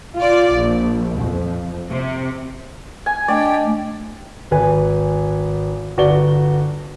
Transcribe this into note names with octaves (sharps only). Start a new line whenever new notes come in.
F4 D5
A#1
F2
C3
G#5
A3 D4 D5 D#5 G5
G#1 B4 G#5
G1 F#4 B4 D5 G7